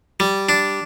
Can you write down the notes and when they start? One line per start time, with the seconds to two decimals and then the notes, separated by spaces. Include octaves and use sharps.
0.20 G3
0.49 D4